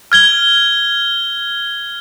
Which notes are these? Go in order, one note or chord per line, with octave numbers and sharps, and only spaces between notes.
F6 G#6 G7